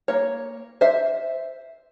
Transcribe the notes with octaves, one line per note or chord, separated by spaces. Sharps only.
A#3 C#5
C5 E5